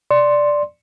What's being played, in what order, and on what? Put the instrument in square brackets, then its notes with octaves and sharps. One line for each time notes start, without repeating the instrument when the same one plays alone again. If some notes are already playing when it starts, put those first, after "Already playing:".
[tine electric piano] D5 C6